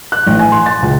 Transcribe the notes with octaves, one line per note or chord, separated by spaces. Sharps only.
F#6
A1
G#5
C6
A6
C#2